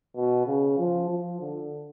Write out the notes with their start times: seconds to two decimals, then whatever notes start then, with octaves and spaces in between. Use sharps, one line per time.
0.16 B2
0.46 C#3
0.78 F3
1.10 F3
1.40 D3